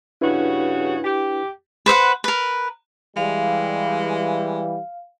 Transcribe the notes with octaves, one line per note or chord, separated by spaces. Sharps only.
G2 C#3 D4 E4 F#4 B4
G4
B4 C5 E5 F#5
A#4 B4
E3 G3 G#3 F5